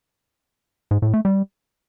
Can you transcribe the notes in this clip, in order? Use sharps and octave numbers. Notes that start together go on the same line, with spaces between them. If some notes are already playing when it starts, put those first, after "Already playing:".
G#2
A2
A3
G3